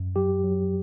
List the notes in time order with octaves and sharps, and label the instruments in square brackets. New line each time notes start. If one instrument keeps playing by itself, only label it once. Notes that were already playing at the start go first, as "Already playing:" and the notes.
Already playing: [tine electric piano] F#2
F#3 G4
F#3